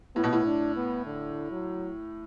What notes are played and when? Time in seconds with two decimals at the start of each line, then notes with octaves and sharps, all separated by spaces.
0.15 A2 B3
0.24 B2
0.33 A2
0.46 D4
0.76 B3
1.06 D3
1.52 F#3